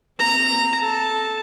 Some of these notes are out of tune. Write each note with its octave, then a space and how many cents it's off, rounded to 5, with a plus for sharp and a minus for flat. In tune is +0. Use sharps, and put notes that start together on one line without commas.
C4 +0 A#5 -15
A4 -15 A5 +0